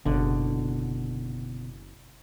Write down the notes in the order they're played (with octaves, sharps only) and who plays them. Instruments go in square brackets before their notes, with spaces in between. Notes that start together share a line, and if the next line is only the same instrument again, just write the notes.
[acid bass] F#1 [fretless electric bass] B2 D3